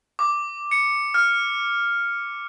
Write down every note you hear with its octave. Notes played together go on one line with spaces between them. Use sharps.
D6
C#7
F6